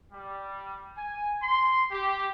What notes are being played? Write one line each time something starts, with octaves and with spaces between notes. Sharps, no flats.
G3
G#5
C6
G4